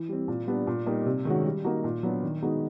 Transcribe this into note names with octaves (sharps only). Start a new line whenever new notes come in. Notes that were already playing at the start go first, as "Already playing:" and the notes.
Already playing: E3
G3 C4
A#2
G3 B3 D4
A#2
G3 A#3 D#4 G4
C3
D#3 G#3 C#4 F#4
G3
A#3 D#4 F#4
A#2
F#3 B3 D4
D#3
G#3 B3 D#4 F#4